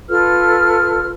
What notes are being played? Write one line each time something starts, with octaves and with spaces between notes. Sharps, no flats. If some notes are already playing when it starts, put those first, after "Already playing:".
F4 A4 B4 F6